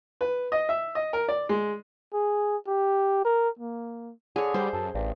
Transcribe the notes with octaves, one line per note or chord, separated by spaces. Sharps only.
B4
D#5
E5
D#5
A#4
D5
G#3
G#4
G4
A#4
A#3
D3 G#4 C#5
G3 C5
F#2 A4
A1 G2